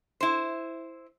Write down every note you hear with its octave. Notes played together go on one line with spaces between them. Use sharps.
E4 C5